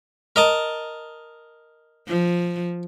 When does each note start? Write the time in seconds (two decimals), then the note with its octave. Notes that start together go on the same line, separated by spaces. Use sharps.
0.36 A#4 D#5 A5
2.08 F3